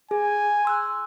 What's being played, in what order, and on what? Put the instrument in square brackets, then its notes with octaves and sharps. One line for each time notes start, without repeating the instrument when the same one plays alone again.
[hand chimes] G#4 [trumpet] G#5
[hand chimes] C6 E6 F#6